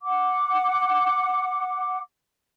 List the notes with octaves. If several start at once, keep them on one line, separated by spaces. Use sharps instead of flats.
F#5 D6